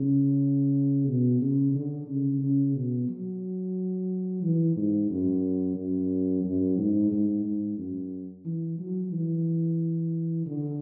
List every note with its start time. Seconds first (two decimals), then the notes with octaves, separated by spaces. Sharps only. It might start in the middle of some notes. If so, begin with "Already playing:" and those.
Already playing: C#3
1.08 B2
1.41 C#3
1.75 D3
2.08 C#3
2.41 C#3
2.75 B2
3.09 F#3
4.43 E3
4.76 G#2
5.10 F#2
5.77 F#2
6.44 F#2
6.78 G#2
7.11 G#2
7.45 G#2
7.78 F#2
8.45 E3
8.79 F#3
9.12 E3
10.46 D3